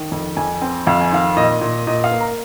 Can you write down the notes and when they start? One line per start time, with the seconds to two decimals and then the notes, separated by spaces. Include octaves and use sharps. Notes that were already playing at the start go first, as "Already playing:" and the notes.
Already playing: D#3
0.12 F2
0.37 F2 G#5
0.62 C4
0.87 F2 F5
1.01 G#5
1.12 D#3 F5
1.36 A#2 D#5
1.61 A#2
1.87 A#2 D#5
2.04 F5
2.11 A#3
2.20 A#5